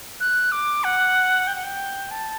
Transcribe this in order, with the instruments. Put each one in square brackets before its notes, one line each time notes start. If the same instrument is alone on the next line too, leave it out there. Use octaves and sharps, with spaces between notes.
[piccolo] F#6
D6
F#5
G5
F#5
G5
A5